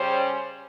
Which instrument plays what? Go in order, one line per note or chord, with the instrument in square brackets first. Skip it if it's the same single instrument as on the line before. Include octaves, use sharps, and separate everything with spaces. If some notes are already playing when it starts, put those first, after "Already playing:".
Already playing: [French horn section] C#3 G3 C#4 C5